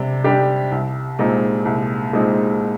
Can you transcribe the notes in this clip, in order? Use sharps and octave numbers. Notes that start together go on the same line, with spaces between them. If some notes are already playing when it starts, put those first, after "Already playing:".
Already playing: C3 G3 D4
G3 D4 G4
C2
A#2 G#3 C4 D#4
C2
A#2 G#3 C4 D#4